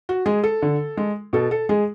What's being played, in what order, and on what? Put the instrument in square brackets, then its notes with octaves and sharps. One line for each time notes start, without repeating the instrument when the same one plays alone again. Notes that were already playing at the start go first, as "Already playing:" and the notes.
[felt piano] F#4
G#3 G#4
A4
D3
G#3
B2 A4
A4
G#3 G#4